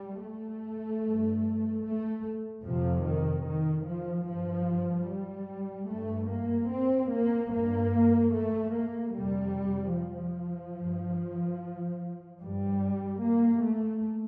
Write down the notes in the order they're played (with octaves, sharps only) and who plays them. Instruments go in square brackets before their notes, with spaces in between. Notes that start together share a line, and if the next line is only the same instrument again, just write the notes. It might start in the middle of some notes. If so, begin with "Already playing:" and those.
Already playing: [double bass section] G3
A3
G2
A3
F2 C3 F3
D#3
D#3
F3
G2 F3
G3
G2 A3
A#3
C4
A#3
G2 A#3
A3
A#3
F2 C3 G3
F3
G2
G2 G3
A#3
A3